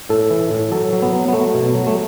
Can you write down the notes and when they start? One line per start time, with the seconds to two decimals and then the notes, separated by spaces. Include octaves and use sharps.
0.09 A2 A4
0.30 E3
0.51 A2
0.72 F#3 A4
0.93 F#3
1.02 B3
1.13 F#3
1.28 B3
1.33 F#3 A3
1.54 B2
1.74 F#3
1.87 A3